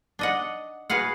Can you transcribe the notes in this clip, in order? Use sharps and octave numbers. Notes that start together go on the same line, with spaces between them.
D4 D#5 F#5
F#4 G#4 B4 F5 F#5